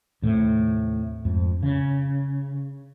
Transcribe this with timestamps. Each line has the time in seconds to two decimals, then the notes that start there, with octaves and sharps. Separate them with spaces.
0.22 D#2 A2 C3
1.25 F2 G#2
1.63 C#3